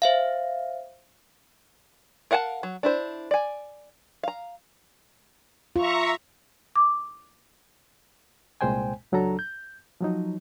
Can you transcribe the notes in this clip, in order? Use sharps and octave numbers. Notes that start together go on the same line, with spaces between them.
C5 E5 F5
A#4 F5 F#5 G#5 A5
F#3
D4 E4 C5
D5 G#5
F5 A#5
F4 E5 A#5 C#6
D6
C2 A#2 G#3 C5 G5 G#5
C#2 F#3 D4 A4 A#5
G6
F3 F#3 D#4